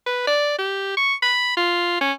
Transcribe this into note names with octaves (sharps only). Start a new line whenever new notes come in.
B4
D5
G4
C#6
B5
F4
C#4